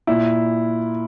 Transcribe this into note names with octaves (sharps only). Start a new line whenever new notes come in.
A#2 E4